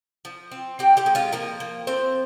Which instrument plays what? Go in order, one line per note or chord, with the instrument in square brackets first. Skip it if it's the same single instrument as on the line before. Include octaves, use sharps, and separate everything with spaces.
[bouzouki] F3
C4
C4 G4 G5
G4 G5
G#3
F4 F5
F3 A#3 A#4
A#3
F3 C4 C5